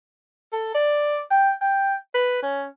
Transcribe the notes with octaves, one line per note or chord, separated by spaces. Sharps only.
A4
D5
G5
G5
B4
C#4